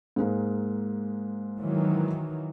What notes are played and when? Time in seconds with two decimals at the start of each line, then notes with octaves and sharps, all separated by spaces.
0.16 G#2 G#3 A#3
1.59 D#3 E3 F#3